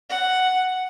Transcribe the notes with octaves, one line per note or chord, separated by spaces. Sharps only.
F#5